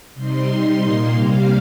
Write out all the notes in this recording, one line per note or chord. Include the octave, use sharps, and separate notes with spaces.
C3 G3 C4 D#4 C6
C3 G3 D#4 C6
A#2 A#3 D#4 C6
C3 G3 A#3 F5